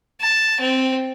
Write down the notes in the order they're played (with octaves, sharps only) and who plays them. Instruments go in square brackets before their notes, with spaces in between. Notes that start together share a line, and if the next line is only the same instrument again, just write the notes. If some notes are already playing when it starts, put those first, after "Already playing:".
[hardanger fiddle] A5
C4